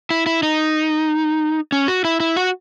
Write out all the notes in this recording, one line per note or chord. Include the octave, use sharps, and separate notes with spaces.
E4
E4
D#4
C#4
F#4
E4
E4
F#4